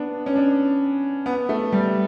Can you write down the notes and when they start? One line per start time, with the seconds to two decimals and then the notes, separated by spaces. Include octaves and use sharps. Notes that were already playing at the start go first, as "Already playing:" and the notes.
Already playing: B3 D4
0.26 C#4
0.36 D4
1.26 B3
1.49 A3
1.72 G3